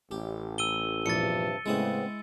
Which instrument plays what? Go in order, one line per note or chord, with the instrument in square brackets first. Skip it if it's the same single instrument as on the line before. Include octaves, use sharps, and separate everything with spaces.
[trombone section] A1 [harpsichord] G4
[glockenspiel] E6 D#7 G7
[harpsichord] A#1 E2 [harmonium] G2 C3 A5 [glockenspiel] A6 C#7
[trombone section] A2 C#3 [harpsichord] G#3 E4 D#6 [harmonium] B3 C4